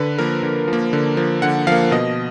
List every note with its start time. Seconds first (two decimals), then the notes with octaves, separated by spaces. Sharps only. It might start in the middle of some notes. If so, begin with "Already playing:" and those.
Already playing: D3 B4
0.18 F3 A#3 A#4
0.43 D3
0.68 F3
0.73 A#3
0.93 D3
1.17 F3 A#3
1.42 D3 F#5
1.67 F3 A#3 F5
1.91 B2 D#5